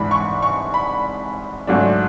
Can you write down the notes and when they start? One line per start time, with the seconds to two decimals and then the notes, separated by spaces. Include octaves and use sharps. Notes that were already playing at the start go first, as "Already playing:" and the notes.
Already playing: G#2 E3 G#3 D4 B5
0.11 C#6
0.42 C#6
0.74 B5
1.67 G#2 F#3 A3 D4